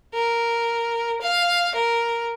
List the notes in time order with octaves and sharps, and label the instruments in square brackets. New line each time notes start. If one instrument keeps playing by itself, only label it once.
[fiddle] A#4
F5
A#4